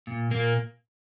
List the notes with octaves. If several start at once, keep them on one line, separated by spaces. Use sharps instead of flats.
A#2
A#2 A#3